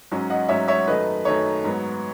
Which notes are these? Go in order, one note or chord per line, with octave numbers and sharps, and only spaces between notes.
G#2 F#3 C#4
D#5 F#5
G#2 F#3 C#4 C#5 E5
C#5 E5
F#2 D#3 A3 D#4 B4 D#5
F#2 D#3 A3 D#4 C#5
G#2 F#3 B3